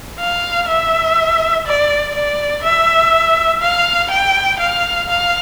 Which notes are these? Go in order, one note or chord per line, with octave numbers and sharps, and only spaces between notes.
F5
E5
D5
D5
E5
F5
G5
F5
F5